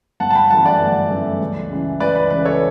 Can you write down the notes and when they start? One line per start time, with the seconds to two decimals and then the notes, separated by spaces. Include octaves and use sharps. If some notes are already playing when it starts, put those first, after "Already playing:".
0.20 G1 F#5 A5
0.30 A5
0.35 G5 B5
0.50 F#2 E3 A3 F#5 A5
0.65 D5 F#5
0.80 G1
1.10 F#2 E3 A3
1.40 C#2
1.70 C#3 E3
2.00 C#2 B4 D5
2.15 B4
2.30 C#3 E3 B4
2.45 A4 C#5